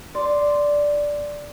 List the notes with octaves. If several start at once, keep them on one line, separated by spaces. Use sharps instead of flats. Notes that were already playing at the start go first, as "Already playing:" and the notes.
D5 C6